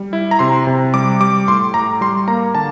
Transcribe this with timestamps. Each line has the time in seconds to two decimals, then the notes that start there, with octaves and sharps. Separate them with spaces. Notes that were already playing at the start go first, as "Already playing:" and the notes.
Already playing: G3
0.13 E4
0.31 A#5
0.39 C3 C6
0.67 C3
0.94 G3 D6
1.20 G3 D6
1.48 A2 C6
1.74 A2 A#5
2.01 G3 C6
2.28 A#3 A#5
2.55 D3 A5